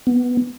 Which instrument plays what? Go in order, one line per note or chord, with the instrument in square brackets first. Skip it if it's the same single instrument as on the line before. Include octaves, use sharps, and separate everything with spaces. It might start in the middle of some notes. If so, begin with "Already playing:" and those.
[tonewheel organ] B3